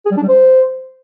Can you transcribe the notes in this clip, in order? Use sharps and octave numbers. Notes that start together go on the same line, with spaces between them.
G#4
G3
D4
G3
C5